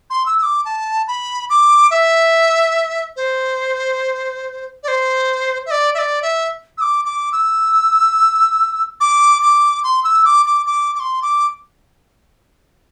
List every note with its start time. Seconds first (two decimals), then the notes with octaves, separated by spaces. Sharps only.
0.10 C6
0.26 E6
0.38 E6
0.43 D6
0.65 A5
1.08 B5
1.50 D6
1.91 E5
3.16 C5
4.83 D5
4.88 C5
5.66 E5
5.71 D5
5.94 E5
5.99 D5
6.22 E5
6.78 E6
6.81 D6
7.05 D6
7.32 E6
9.01 D6
9.42 D6
9.84 C6
10.04 E6
10.25 D6
10.46 D6
10.66 D6
10.95 D6
11.00 C6
11.22 D6